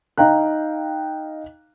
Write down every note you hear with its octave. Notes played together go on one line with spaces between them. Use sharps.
D#4 F5 G5 A#5 F#6